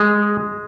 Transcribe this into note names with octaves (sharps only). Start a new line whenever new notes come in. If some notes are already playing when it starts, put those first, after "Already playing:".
Already playing: G#3